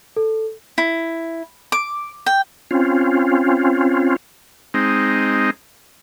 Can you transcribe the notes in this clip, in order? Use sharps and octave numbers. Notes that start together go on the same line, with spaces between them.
A4
E4
D6
G5
C4 C#4 F4
G#3 C4 D#4